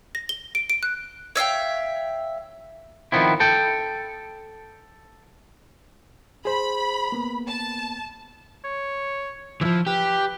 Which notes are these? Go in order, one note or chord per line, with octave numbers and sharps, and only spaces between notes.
A#6
G7
D7
D7
F#6
C#5 E5 F5 G5
D#3 F3 B3 C4 E4
A4 G5
G#4 C5 B5
A#3 B3
A5
C#5
E3 F3 E4
G4 B4